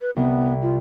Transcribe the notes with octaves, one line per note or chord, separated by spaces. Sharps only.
B4
C2 B3
F4